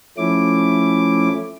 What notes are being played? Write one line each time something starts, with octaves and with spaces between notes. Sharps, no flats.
F3 A3 C#4 E4 D6